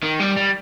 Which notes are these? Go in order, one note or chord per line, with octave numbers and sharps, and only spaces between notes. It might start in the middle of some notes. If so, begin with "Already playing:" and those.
D#3
G3
G3